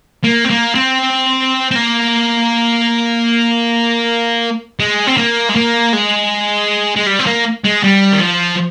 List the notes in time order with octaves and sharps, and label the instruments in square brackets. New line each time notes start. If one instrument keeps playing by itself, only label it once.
[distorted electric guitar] A#3
C4
A#3
C4
C4
A#3
G#3
C4
A#3
G#3
A#3
G#3
G#3
G3
C4
A#3
G#3
G3
D#3
F3